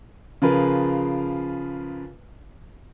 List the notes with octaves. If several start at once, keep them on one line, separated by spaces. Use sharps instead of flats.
C#3 F3 F4 G#4 A#4 B4